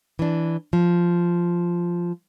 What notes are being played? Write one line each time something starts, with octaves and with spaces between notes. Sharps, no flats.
E3 D4
F3